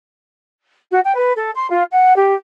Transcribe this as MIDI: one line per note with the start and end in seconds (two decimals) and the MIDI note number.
0.91 1.00 66
1.05 1.12 79
1.16 1.32 71
1.36 1.51 69
1.55 1.68 84
1.70 1.83 65
1.92 2.15 78
2.16 2.33 67